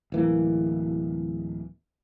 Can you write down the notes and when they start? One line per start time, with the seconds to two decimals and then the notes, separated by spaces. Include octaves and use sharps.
0.12 D1 E3 A#3